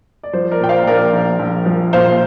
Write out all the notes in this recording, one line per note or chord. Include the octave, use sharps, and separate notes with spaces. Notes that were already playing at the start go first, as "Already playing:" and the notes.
D5
F3 C5
A#4 D5
A#2 G5
C5 F5
A#1 A#4 D5
A#1
A#1
F3
A#2 C5 F5